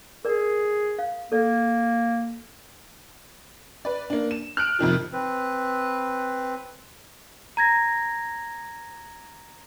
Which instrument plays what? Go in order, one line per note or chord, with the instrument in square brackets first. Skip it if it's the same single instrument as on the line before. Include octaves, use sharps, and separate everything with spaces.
[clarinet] G#4 [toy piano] A#4 D5
[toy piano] F5
[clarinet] A#3 [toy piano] A4 D5
[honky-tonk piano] B4 D5
A#3 D4
E7
F6 F#6 D7
F2 C3 D#3 F3
[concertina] C4 B4
[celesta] A#5 G#6 A#6